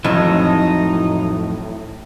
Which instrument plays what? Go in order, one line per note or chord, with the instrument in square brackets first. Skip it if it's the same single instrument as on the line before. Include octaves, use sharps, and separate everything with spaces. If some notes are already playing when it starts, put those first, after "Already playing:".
[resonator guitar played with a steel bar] F2 [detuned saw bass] A2 [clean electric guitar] E3 F#3 [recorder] D#4